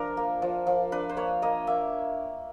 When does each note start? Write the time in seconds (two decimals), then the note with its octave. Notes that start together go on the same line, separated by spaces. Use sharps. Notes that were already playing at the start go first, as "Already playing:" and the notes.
Already playing: F3 D4 A#4
0.17 A#3
0.42 F3
0.67 F3
0.92 D4 B4
1.09 C5
1.17 A#3 C#5
1.42 A#3 D#5
1.67 A#3 E5